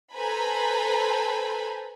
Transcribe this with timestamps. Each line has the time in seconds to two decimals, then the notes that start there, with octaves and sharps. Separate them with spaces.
0.13 A4 B4 C5 G#5 A#5 B5